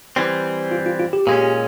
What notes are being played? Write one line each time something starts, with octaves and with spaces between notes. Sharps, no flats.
E3 G3 C4
F4
F4
F4
G4
A#2 G#3 C#4